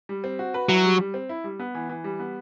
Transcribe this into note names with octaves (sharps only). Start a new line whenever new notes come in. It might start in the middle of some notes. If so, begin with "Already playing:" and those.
G3
C4
F#4
B4
F#3 E4
G3
G3
C4
E4
G3
B3
E3
E3
G3
B3